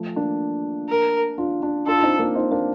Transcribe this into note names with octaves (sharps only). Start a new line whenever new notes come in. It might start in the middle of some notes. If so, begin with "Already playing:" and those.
Already playing: F3 A3
A#3 D4
A#4
D4 F4
D4 F4
D4 F4 A4
F4
C4 D#4
A#3 D4
C4 D#4
A#3 D4